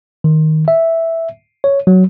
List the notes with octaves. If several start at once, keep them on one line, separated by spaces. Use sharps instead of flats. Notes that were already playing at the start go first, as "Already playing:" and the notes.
D#3
E5
C#5
F#3